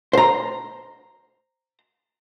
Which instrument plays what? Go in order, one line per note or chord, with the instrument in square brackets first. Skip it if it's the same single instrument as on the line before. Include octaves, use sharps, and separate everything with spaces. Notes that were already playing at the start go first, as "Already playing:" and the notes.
[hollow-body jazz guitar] C5 A#5